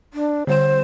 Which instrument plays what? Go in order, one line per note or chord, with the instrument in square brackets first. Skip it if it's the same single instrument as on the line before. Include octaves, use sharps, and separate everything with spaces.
[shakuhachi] D4
[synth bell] D3 G3 E7 [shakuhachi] C5